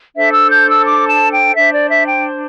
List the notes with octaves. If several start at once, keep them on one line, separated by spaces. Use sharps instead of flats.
D4 A4 C5 E5
E6
G6
E6
D6
A5
G5
D4 C5 E5
D5
E5
G5